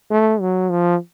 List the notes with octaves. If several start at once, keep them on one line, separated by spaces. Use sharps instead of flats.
A3
F#3
F3